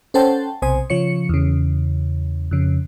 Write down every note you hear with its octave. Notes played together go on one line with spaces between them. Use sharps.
C#4 A4 C5 F#5 G5 A5
B1 C3 C5 G#5 D#6
C#3 F3 C#5 C#7
E2 C#3
F2 C#3